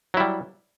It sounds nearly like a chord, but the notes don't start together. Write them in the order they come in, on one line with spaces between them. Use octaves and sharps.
F#3 E4 G3